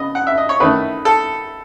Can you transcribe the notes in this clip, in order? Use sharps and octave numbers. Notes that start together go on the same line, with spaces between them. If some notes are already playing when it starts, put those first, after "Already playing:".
Already playing: C#3 B3 D#5
F#5
E5
D#5
C#5
D#3 A3 C#4 E4 B4
A4